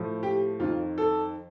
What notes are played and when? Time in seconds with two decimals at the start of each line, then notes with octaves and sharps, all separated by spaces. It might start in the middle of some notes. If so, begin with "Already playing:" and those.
Already playing: A2 F3
0.23 G4
0.60 F2 D#3 F4
0.98 A4